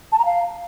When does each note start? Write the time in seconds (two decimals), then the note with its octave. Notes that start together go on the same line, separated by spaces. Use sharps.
0.12 A5
0.19 A#5
0.25 F5